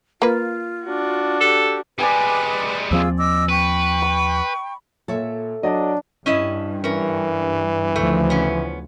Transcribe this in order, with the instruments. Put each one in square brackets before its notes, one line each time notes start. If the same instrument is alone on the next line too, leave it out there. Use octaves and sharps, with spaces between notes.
[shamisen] A#3 B4 [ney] F4
[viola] D4 F#4
[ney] G4 [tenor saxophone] A4
[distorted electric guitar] G3 G#3 [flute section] B4 [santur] D5 G#5 D#6
[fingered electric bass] D#2 F3 C4 [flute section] F4 G#4 E6
[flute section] D#5 D6 E6
[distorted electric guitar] B4 [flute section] G5 C#6
[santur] B5
[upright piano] A#2 [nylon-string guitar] A4 C#5 E5
[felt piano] F#3 [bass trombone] D4 [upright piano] D5 D#5
[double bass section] G2 [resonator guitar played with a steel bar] C#4 E4 D#5
[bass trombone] E3 [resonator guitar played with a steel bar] C#4 A#4
[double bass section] D2 C#3 F3 [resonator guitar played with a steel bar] A3
[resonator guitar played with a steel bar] B3 C#4